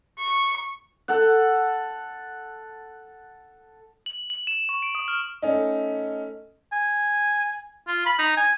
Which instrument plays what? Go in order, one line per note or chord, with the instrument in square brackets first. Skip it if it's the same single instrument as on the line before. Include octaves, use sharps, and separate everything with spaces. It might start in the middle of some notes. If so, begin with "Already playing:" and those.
[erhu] C#6
[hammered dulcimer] A4 F#5
[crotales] F#7
F#7
E7
C#6
D7
D#6
F6
[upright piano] A3 C#4 D#4
[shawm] G#5
F4
B5
D#4
G#5